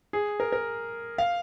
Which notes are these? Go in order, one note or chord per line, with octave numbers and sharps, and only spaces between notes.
G#4
A#4
A#4
F5